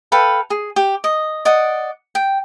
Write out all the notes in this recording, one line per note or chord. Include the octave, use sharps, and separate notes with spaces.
A4 B4 F5 G5
G#4
G4
D#5
D5 D#5 F#5
G5